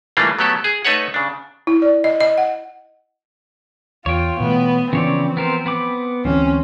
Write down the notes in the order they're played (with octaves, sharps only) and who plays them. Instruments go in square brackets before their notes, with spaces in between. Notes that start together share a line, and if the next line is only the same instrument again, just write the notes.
[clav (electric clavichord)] E3 G3 A3 A#3 D4 F4
F#3 A3 B3 G4 A4
G#4
A3 D#4 A4 B4 C#5 F#5
C#3 D4
[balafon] E4
D5
D#5
D#5
F#5
[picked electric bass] E2 [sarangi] F4 [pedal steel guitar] C#5 G5
[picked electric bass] B2 E3 A3 [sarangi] B3
[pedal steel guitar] C#3 C#5 D5 [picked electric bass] E3 F3 [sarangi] C4
[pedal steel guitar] B3 A#4 C5
B3 B5 D6
[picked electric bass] D2 E3 G#3 [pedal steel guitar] C4 [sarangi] C#4